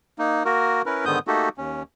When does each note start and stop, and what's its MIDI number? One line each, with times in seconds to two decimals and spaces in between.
0.19 0.43 58
0.19 0.43 63
0.45 0.82 58
0.45 0.82 66
0.45 0.82 70
0.86 1.05 61
0.86 1.05 64
0.86 1.05 70
0.86 1.05 71
1.05 1.19 44
1.05 1.19 50
1.05 1.19 51
1.05 1.19 59
1.05 1.19 87
1.05 1.19 91
1.27 1.49 57
1.27 1.49 58
1.27 1.49 63
1.27 1.49 66
1.27 1.49 67
1.27 1.49 69
1.58 1.83 39
1.58 1.83 61